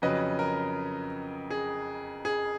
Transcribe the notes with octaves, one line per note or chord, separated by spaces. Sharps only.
F2 C#3 F#3 B4 D#5
A#4
G#4
G#4